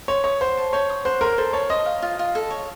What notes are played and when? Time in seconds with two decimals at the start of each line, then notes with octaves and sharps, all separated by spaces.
0.08 C5 C#5
0.24 C#5 D#6
0.41 C5 F#5
0.57 A5
0.73 C5 C#5
0.90 D#6
1.05 C5 F#5
1.21 A#4 C6
1.38 A4 C5
1.53 C#5 A5
1.69 C5 D#5
1.86 F5
2.02 F4
2.19 F4
2.35 A4
2.51 C#5